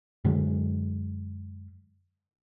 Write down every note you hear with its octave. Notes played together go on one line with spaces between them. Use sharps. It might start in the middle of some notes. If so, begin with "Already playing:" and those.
F#2 D3 F#3 G#3